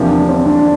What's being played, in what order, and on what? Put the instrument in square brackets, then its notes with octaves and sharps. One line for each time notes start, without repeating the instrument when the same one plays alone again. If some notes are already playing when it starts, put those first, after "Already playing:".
Already playing: [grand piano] E2 C3 F3 A#3 [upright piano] D4
[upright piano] D4
C4
D4
D4